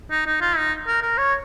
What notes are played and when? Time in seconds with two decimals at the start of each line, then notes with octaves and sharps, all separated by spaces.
0.11 D#4
0.26 D#4
0.41 F4
0.57 D#4
0.87 A#4
1.02 A#4
1.18 C#5